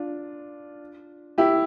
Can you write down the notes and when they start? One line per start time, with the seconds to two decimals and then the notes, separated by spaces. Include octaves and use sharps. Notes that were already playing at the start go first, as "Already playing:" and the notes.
Already playing: D4 F4
1.38 E4 G4